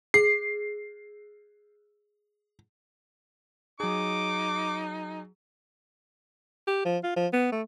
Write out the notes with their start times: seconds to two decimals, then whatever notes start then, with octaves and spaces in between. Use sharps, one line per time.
0.14 G#4 C7
3.80 F#3 D#4 G#4 D6
6.68 G4
6.85 F3
7.03 F4
7.16 F3
7.33 B3
7.52 A3